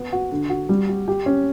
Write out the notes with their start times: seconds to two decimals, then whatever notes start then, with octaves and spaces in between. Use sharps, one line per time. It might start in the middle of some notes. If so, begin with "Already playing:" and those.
Already playing: B3
0.12 F#4
0.32 D3
0.49 F#4
0.69 G3
0.89 G4
1.08 G4
1.26 C#4